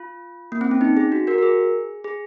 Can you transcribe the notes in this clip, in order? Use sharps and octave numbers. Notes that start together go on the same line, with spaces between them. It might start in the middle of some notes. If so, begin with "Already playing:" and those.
Already playing: F4
A#3
C4
C#4
D#4
G#4
F#4
F#4 A#4
A#4
G#4
G#4